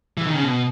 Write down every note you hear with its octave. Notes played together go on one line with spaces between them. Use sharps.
E3
D#3
C#3
B2